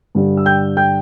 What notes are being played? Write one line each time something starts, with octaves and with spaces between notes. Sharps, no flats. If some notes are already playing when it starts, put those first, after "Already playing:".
G2 D3 G3
E6
G5 G6
G5 G6